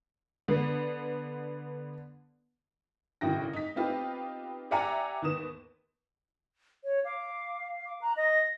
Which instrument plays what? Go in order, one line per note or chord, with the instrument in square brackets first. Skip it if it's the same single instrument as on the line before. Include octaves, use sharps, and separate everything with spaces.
[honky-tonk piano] D3 B3
G#1 A2 C#3 F#4 G5 A#6
D#4 B6
B3 C4 D#4 F4 G4 B4
G4 D5 E5 F#5 G#5 A#5
D#2 G#2 B3 D#6 E7
[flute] C#5
[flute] F5 [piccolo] D6
[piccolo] D6
[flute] A#5 [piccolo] F#6
[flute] D#5 [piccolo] A#6